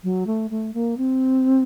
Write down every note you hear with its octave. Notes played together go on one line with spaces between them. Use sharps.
F#3
A3
A3
A#3
C4